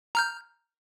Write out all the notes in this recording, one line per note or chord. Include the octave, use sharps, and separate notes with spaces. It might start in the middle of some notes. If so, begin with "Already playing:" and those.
A#5 F6 G6